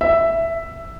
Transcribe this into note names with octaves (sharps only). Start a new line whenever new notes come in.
E5